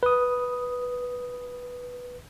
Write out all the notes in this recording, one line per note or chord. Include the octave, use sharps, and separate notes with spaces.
B4 D#6